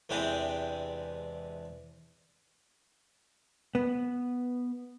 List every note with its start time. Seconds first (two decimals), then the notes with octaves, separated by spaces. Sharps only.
0.09 E2 C3 E3 G#3 D4 G5
3.75 B3